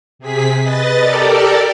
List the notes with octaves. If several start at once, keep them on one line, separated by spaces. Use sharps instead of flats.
C3 G#4 B6
B4 D#5 A6
G4 A4 A#4 D5